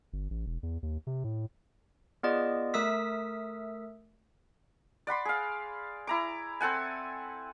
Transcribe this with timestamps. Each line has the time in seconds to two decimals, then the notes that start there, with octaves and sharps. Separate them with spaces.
0.13 G1
0.30 A1
0.46 E1
0.63 E2
0.83 D#2
1.07 C3
1.24 A2
2.23 B3 F4 G#4 D5 D#5
2.74 A3 A#4 E5 D#6 E6 B6
5.07 D5 F#5 B5 C6
5.25 G#4 F5
6.07 E4 A#5 D6
6.61 C4 A4 F#5 G#5